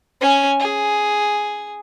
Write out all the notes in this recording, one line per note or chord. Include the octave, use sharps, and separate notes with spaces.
C#4 G#5
G#4